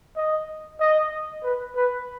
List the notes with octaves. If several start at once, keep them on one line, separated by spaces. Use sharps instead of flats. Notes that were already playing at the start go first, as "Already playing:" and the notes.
D#5
D#5
B4
B4